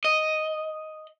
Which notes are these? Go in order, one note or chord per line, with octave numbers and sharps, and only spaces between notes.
D#5